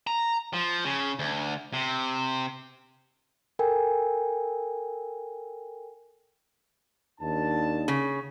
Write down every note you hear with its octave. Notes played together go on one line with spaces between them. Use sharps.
A#5
F3
C#3
D2
C3
A4 A#4 G5 G#5
D#2 D4 A5
C#3